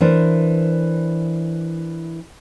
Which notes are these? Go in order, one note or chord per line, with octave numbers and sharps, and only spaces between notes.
E3 D4 A#4 C5